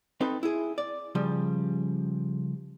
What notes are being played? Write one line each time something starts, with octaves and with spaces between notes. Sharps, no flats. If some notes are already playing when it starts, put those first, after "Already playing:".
C4 D#4 A4 B4
E4 G#4
D5
C#3 F3 G3